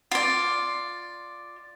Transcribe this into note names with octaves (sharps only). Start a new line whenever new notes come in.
F4 D5